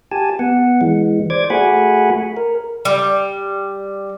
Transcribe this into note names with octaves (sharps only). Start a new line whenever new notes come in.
G4 G#5 A5
B3 F#5
E3 G#3
C5 D5 D6 G#6
A3 F#4 G#4 F#5 G#5 B5
A#4
G3